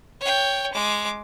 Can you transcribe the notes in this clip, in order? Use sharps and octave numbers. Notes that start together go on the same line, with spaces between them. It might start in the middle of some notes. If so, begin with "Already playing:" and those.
C#5 G5
G#3 D6